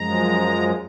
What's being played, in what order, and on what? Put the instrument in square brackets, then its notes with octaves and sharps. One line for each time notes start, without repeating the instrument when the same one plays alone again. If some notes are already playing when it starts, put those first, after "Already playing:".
Already playing: [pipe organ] F#2 F3 G#3 A#5